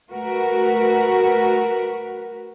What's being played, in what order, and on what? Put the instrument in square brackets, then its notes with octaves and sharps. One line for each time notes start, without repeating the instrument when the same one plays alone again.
[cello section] A3 F#4 A#4 B4